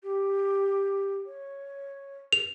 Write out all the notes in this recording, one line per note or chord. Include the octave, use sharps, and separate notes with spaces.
G4
C#5
F7